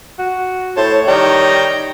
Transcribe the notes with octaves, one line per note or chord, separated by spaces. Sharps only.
F#4
A2 C5 C#5 A5
D#3 G3 G5 A#5